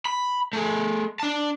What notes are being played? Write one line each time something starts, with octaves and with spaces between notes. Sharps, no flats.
B5
A3 G#4
D4 A5